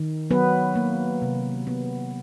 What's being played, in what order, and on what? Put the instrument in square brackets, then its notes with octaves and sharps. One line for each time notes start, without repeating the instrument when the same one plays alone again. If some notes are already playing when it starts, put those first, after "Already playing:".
Already playing: [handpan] D#3
F#3 B3 B4
A#3
C3
B3